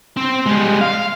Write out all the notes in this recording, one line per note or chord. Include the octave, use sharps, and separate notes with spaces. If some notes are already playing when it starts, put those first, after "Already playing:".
C4
G3 G#3
F5